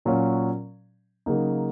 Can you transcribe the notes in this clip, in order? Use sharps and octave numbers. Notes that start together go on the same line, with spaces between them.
A#2 F#3 C#4 F4
C#3 F#3 A#3 D#4